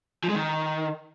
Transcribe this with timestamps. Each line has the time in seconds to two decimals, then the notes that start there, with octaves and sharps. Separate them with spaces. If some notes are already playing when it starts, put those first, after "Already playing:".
0.24 F3
0.29 G#3
0.35 D#3